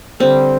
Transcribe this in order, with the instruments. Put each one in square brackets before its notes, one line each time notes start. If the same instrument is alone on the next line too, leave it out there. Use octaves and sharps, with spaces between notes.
[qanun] D3 G3 C4